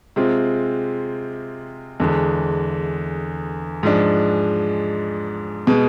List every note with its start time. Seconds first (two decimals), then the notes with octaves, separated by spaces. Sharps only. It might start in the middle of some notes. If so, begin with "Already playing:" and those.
0.16 C3 G#3 C4 F4
2.00 E2 D3 G#3
3.83 G#2 F3 G#3 D4
5.67 B2 G#3